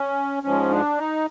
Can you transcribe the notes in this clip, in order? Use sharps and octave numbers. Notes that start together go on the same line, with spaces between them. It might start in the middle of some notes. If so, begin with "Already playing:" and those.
Already playing: C#4
G#2 F3 G#3 C#4
D4
D#4